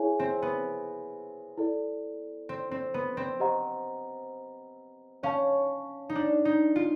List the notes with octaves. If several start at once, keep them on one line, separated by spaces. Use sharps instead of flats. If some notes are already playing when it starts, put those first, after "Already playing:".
Already playing: E4 G#4 C#5 E5 G#5
C4
B3
E4 A4 D5
C4
C4
B3
C4
G4 C5 D#5 F#5 A#5
C#4 C#5 F5 A5
D#4
D4
D#4
F4